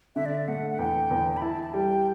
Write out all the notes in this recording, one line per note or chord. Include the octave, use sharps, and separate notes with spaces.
D3 E5
D5
E5
A3 F#5
F#5
E2 G5
E2
B5
E4 A5
A5
G3 G5